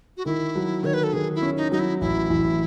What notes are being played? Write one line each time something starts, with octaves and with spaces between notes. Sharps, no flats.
F#4
D#3 E4
F#3
D#3 C#5
B4
A4
D#3 G#4
E4
C#4
D#4
F#3 D#4
E4
A1 E4
A1